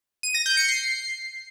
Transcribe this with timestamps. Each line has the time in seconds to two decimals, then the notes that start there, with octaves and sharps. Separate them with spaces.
0.23 D#7
0.34 A#6
0.46 G6
0.57 C#7
0.68 C7